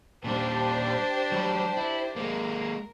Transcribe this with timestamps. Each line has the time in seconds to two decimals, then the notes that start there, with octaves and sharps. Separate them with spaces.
0.24 A#2 G3 D4 G4 C5
1.32 F#3 G3
1.77 E4
2.16 G#3 A#3 A#4